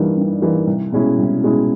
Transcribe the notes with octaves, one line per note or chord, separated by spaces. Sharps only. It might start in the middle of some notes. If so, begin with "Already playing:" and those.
Already playing: G2 E3 G3 A#3 D#4
G2
E3 G3 A#3 D#4
C2
B2 G#3 C#4 E4
C2
B2 G#3 C#4 E4